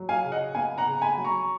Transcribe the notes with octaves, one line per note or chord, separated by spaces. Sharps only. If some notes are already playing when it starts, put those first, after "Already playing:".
Already playing: F#3
F5 G#5
C#3
D#5 F#5
B3 F5 G#5
F#5 A#5
C#3
G#5 B5
F#3
A#5 C#6